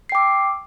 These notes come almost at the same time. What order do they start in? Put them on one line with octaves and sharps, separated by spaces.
C7 G5 D6 E6